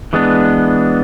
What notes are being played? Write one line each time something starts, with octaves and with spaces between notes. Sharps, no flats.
E3 G#3 B3 D4